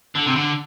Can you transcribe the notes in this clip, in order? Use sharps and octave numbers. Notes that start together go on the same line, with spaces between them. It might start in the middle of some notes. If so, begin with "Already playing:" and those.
D3
C3
D3